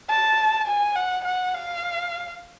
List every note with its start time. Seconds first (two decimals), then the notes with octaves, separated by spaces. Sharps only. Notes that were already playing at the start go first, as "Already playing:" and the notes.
0.10 A5
0.67 G#5
0.95 F#5
1.25 F#5
1.54 F5